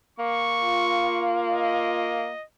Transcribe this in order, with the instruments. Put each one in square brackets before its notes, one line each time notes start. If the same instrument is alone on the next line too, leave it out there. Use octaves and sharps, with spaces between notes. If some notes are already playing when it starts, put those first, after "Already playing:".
[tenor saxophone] A#3 [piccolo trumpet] C#6
[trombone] F4
[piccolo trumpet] D#5